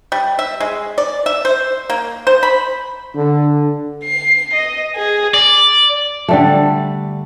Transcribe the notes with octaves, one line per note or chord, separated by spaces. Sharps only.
G3
E5
G#3
D5
E5
C5
A#3
C5
B5
D3
C7
D#5
G#4
D5
D3 G3 A3